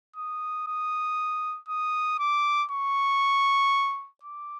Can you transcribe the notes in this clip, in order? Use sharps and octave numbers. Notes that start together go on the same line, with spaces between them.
D#6
D#6
D#6
D6
C#6
D6